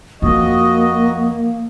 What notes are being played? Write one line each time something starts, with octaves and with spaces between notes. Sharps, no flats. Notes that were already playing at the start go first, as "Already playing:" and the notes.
F2 F3 A#3 F#4 D#5